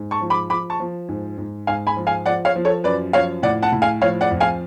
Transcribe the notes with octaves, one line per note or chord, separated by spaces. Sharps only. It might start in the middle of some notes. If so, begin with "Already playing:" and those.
Already playing: G#2
A5 C#6
F3
B5 D6
F3 B5 D6
A5 C#6
F3
G#2
G#2
G#2 F5 G#5
G#5 B5
F3
F5 G#5
F3 D5 F#5
C#5 F5
F3
A4 C#5
F#2 B4 D5
F3 C#5 F5
A2 D5 F#5
F#5 A5
A2
F5 G#5
F3 C#5 F5
D5 F#5
F2
F5 G#5